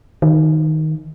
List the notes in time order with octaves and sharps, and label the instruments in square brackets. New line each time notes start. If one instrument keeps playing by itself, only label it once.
[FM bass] D#3